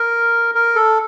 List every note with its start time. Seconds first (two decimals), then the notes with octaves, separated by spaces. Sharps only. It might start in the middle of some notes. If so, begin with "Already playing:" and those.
Already playing: A#4
0.55 A#4
0.76 A4